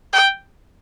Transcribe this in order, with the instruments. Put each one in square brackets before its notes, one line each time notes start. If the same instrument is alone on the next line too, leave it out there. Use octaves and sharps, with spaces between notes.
[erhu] G5